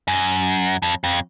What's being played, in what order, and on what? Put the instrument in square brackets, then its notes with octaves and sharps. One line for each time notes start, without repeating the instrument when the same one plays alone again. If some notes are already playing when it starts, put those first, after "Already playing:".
[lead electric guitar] F#2
F2
F2